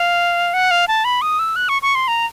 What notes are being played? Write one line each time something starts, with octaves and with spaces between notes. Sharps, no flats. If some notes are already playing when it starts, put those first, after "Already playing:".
Already playing: F5
F#5
F5
A5
B5
D#6
E6
F#6
C#6
C#6
C6
A#5